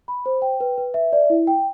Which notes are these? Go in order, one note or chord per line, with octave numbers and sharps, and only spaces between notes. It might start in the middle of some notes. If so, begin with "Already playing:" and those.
B5
C5
G5
B4
B4
E5
D5
E4
G5